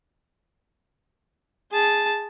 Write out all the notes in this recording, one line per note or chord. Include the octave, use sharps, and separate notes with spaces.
G#4 A5